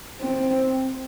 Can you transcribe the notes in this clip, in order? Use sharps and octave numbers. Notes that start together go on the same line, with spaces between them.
C4